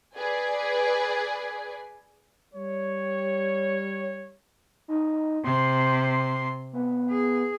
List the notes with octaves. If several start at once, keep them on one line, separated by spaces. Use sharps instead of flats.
G#4 B4 D5 G#5
G3 C#5
D#4
C3 C6
B3
G#4